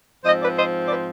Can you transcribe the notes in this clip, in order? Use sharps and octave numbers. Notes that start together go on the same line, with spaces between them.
G#2 F3 C4 C5 D#5
B4 D5
C5 D#5
B4 D5